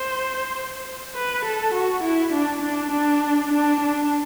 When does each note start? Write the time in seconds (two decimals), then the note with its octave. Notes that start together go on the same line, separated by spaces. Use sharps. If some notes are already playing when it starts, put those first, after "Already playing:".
Already playing: C5
1.15 B4
1.45 A4
1.74 F#4
2.04 E4
2.33 D4
2.62 D4
2.92 D4
3.51 D4
3.80 D4